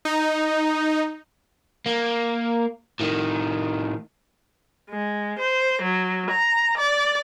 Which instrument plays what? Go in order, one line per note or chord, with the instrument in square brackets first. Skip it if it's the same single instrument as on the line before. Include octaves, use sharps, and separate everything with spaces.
[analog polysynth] D#4
[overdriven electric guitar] A#3
A2 D#3
[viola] G#3
C5
F#3
A#5
D5